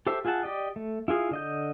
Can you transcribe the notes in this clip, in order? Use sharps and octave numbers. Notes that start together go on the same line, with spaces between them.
G4 A4 C5 E5
F4 G#4 E5 F#5 A5
G4 D5 D#5
A3
E4 F4 G#4 F5
D3 D#5 G6